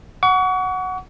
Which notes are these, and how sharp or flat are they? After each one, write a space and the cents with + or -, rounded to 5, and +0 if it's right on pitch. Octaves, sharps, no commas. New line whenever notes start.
F#5 +0 C#6 +35